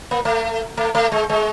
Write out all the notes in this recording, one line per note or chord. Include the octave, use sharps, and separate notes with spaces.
A#3
A3
A3
A3
G#3
G#3